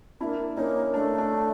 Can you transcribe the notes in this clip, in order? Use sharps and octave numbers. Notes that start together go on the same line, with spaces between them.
A#3 C4 D4 E4
A#3 C#4 D#4
A3 D4
D4